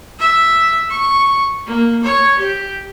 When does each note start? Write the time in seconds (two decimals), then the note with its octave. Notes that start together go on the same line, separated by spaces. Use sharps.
0.19 E5
0.90 C#6
1.67 A#3
2.03 C#5
2.39 G4